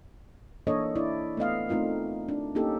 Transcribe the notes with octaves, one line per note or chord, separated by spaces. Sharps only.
E3 A#3 D4 A4 C#5 D#5
D4 E4 D5
A3 B3 D#5 F5
A3 C4 D#4 F4 A#4
D4
A#3 C#4 D#4 G4 A4